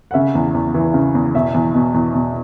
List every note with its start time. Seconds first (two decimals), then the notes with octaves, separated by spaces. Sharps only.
0.11 F#5
0.14 C#3 E5
0.35 E2
0.54 E2
0.74 E3
0.94 C#3
1.15 E2
1.34 B2 E5
1.54 E2
1.74 B2
1.94 E2
2.14 B2